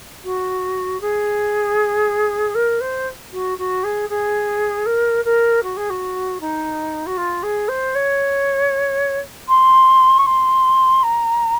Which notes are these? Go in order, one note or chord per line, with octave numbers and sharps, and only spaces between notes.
F#4
G#4
A#4
C5
F#4
F#4
G#4
G#4
A#4
A#4
F#4
G#4
F#4
D#4
F#4
F4
G#4
C5
C#5
C6
C#6
C6
A#5